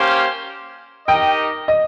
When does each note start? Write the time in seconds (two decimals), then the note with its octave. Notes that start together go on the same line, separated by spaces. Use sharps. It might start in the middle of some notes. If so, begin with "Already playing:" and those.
Already playing: A#3 C#4 G4 C5 F5
1.08 D#4 G4 A#4 D#5 G5
1.68 D#5